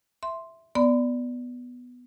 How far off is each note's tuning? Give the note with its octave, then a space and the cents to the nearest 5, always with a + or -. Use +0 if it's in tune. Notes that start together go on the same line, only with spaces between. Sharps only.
E5 +0 C6 +0
B3 +0 D5 +0 C6 -40